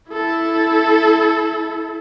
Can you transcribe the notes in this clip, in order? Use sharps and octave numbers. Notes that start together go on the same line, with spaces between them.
E4 A4